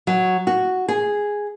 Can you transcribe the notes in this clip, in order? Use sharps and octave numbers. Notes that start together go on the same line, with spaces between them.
F#3
F#4
G#4